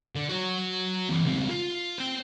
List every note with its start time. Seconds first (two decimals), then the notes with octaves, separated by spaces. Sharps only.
0.15 D3
0.29 F#4 C#5
1.09 E3 C4
1.23 C#2 C4
1.49 F4
1.98 C5 G5